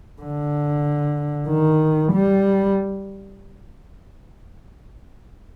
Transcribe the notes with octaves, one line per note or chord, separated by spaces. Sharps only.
D3
D#3
G3